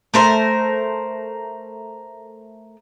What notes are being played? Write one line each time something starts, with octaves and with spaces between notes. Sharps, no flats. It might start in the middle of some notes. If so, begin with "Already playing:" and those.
A3 A#4 C5